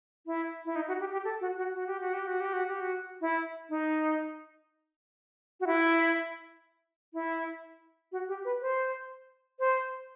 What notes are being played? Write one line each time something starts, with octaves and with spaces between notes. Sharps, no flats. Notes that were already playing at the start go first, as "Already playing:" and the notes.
E4
E4
D#4
F#4
G4
G4
A4
F#4
F#4
F#4
G4
F#4
G4
F#4
G4
F#4
G4
F#4
E4
D#4
F#4
E4
E4
F#4
G4
B4
C5
C5